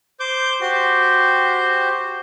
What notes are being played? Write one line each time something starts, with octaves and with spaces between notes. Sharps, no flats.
C5 D6 G6
F#4 G4 C5